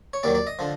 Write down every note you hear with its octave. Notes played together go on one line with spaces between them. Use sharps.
C#5
D#2 D#3 F#3 D5
D5
D#5
D3 F3